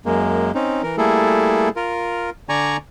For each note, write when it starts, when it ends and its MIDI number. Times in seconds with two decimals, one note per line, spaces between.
0.06 0.52 42
0.06 0.52 56
0.06 0.52 58
0.55 0.82 60
0.55 0.82 61
0.55 0.82 63
0.83 0.96 52
0.83 0.96 70
0.98 1.69 55
0.98 1.69 57
0.98 1.69 58
0.98 1.69 64
0.98 1.69 68
0.98 1.69 69
1.76 2.30 65
1.76 2.30 70
2.49 2.77 50
2.49 2.77 74
2.49 2.77 80
2.49 2.77 82
2.49 2.77 85